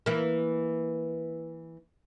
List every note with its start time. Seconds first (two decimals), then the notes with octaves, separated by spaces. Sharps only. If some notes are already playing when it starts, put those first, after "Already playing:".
0.06 E3 A#3